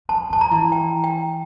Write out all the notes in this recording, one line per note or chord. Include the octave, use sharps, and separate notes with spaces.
F3 A5
F3 A5
A#5
E3
G5
G5